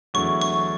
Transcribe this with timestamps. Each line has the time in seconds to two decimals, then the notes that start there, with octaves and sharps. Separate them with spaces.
0.14 E2 D3 F#3 A3 E4 C#6
0.42 C#6